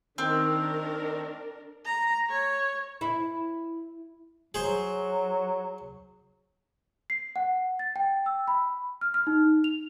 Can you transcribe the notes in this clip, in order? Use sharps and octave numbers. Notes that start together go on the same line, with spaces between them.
D#3 C4 D4 A#4
A#5
C#5
E4
F#3 G#4 C5
C7
F#5
A6
G5
E6
B5
F6
F6
D#4
F7